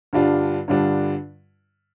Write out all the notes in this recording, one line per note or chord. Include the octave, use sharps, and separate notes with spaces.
G2 D3 G3 D4 F4
G2 D3 G3 D4 F4